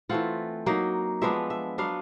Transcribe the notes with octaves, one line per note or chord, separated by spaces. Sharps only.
E3 A3 C4 F4 F#5
F#3 A#3 D#4
F3 G#3 B3 D4 E5
E5
F#3 B3 D4 F5